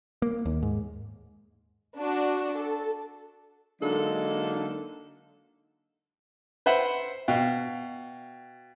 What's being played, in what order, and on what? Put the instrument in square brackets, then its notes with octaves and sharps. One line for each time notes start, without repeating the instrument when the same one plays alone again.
[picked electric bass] A#3
D#2
G#2
[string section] D4 F#4
A4
[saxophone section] D3 F#3 G#3 A#3 D#4 A4
[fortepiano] B4 C5 E5 F#5
B2 F5 G5